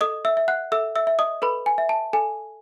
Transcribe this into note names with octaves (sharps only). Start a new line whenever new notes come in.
A4 D#5 D#6
E5 E6
E5
F#5 F#6
A4 E5 E6
E5 E6
E5
D#5 D#6
A4 B4 B5
G#5
E5
A5
A4 G#5